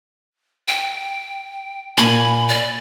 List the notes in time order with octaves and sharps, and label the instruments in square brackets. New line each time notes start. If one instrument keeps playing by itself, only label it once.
[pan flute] G5
[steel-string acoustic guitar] A#2 G#5 [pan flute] B5
[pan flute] D5